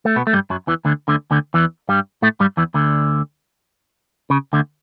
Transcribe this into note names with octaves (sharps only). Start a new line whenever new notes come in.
A3
B2 B3
A3
G2 G3
F#2 F#3
E2 E3
D2 D3
D2 D3
D2 D3
E2 E3
G2 G3
A2 A3
G2 G3
E2 E3
D2 D3
C#3
D2 D3